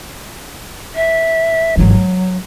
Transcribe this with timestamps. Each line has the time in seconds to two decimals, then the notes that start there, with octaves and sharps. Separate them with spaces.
0.95 E5
1.77 G#1 E3 F#3
1.96 G#3